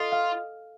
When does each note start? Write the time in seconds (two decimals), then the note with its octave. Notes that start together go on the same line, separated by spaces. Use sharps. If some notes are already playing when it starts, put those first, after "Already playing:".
Already playing: F4 A4 D#5
0.12 F5